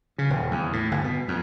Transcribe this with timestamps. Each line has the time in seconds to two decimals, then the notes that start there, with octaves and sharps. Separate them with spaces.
0.18 C#3
0.30 D#1
0.51 E2
0.73 A2
0.91 G1
1.04 B2
1.28 F2